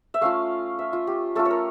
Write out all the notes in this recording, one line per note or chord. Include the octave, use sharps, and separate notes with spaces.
E5
A3 C#4 F4 F5
E5
F4
G4
A3 C#4 F4 A4
C#5
A#4